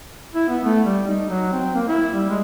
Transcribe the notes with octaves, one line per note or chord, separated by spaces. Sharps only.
E4
B3
A3
G3
D#4
F#3
C4
A#3
E4
G3
G#3